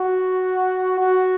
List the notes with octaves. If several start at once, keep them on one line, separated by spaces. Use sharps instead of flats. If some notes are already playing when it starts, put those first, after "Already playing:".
Already playing: F#4
F#4